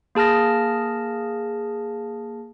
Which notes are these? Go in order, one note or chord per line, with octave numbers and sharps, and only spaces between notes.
A#3 G#4 A5 F6 A#6